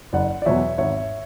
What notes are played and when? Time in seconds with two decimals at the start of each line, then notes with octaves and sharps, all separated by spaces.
0.13 F#1 D5 F#5
0.42 D5
0.46 E2 B2 F#3 C#5 E5
0.78 G#1 C#5 E5